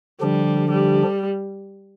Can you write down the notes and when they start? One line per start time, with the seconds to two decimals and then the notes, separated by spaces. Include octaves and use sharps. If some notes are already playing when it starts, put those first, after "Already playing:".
0.21 D3 F3 G3 D4 G4
0.72 G3